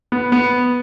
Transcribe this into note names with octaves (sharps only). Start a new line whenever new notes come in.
B3
B3